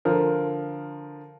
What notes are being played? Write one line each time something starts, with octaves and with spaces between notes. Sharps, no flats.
D3 F3 A#4